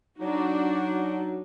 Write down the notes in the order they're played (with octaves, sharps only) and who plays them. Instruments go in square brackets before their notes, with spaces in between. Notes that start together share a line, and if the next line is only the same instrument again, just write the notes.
[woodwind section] F#3 D#4 [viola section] D4 F#4